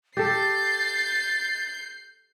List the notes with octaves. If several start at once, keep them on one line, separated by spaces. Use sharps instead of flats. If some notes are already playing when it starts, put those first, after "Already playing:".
G4 A4 G6 A6 C7